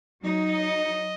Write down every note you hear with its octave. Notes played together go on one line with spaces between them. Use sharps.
F#3 D#4
D#5